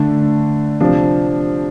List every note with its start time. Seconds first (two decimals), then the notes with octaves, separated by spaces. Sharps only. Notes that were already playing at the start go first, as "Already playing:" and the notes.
Already playing: D3 A3 D4
0.80 C3 F3 D4